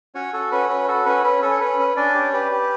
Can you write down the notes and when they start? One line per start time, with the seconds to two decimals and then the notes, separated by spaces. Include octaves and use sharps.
0.15 C#4 F#4 C#5
0.33 F#4 A4
0.52 C#4 B4
0.69 F#4 B4
0.88 F#4 A4
1.05 C#4 B4
1.24 C#4 B4
1.42 C#4 A4
1.51 C#5
1.60 C#4 B4
1.79 C#4
1.96 C#4 D4 D5
2.15 G4
2.33 G4 B4
2.51 G4